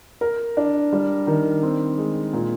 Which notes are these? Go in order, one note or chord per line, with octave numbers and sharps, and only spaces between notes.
A#4
D4
G3
D#3
C4
G#3
A#2